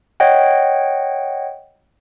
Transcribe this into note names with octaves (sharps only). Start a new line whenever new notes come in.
C#5 D#5 F#5 G5